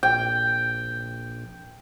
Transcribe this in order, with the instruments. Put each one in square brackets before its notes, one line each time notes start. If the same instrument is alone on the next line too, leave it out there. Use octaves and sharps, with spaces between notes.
[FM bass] A#1 [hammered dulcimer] G5